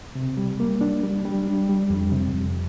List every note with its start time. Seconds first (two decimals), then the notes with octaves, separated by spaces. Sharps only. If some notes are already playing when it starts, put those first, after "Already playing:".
0.15 C3
0.37 G3
0.60 A#3
0.81 D4
1.03 G3
1.25 G3
1.47 D4
1.69 G3
1.90 F2
2.12 C3
2.34 F2